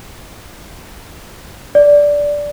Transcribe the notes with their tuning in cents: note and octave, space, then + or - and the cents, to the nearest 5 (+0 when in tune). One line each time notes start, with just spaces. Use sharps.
D5 -10